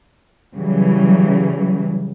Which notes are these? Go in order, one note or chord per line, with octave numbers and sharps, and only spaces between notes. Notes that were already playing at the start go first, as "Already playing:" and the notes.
C#3 E3 F#3 G3